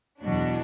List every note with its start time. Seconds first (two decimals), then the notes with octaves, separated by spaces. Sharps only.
0.22 E2 B2 F#3 D4